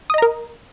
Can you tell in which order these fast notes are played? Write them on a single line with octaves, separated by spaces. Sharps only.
D#6 D#5 A#5 A#4